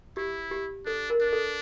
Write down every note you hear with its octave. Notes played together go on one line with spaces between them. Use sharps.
E4 G4
G4
D4 A4
A#4
D4
A4